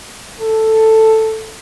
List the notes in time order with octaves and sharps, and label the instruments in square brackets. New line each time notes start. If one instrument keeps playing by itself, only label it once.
[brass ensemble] A4